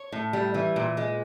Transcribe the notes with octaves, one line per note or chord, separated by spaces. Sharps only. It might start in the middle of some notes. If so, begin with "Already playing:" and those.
Already playing: C#5
A2
G3
E3
A#2
G#3